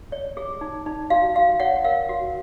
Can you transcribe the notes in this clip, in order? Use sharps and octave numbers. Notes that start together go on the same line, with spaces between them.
C#5
G#4
D#4
D#4
F#4 F5
F#4 F5
C#5 F#5
A#4 F5
F#4